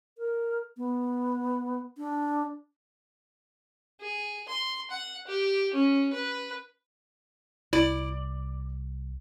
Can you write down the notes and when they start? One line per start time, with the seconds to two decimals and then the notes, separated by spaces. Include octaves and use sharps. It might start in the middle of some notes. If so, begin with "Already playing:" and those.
0.18 A#4
0.77 B3
1.98 D4
4.01 G#4
4.48 C6
4.91 F#5
5.27 G4
5.73 C#4
6.12 B4
7.73 C2 E4 D5